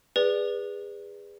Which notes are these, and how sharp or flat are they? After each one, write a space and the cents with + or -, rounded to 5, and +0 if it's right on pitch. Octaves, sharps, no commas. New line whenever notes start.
G#4 -25 B4 +0 D5 +0